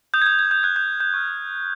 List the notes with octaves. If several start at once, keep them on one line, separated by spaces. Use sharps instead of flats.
D#6 G6
G#6
G6
G#6
G6
D#6 F#6 G#6
G6
G6
C#6 F6